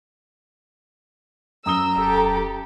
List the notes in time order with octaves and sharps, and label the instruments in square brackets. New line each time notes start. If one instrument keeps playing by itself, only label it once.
[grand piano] F#2 D#6 G7 [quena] A#5 [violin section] E6
[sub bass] E1 [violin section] G4 A4